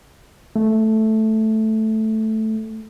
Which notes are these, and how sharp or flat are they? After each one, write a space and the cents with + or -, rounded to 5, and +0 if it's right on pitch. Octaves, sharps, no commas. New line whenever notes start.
A3 -5